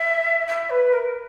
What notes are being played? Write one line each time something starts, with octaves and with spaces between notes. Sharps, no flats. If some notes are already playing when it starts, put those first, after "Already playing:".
Already playing: E5
E5
B4
A#4